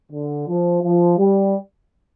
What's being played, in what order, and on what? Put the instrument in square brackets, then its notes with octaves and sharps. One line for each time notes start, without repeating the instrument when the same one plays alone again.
[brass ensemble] D3
F3
F3
G3